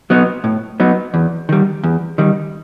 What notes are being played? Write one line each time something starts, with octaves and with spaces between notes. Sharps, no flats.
F#3 B3 D#4
A2
F#3 B3 D#4
E2
D#3 G3
E2
D#3 G3